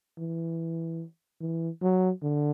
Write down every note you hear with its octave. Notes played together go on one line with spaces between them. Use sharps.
E3
E3
F#3
D3